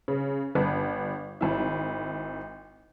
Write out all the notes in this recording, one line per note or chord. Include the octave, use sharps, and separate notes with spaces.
C#3
G1
G#1 E4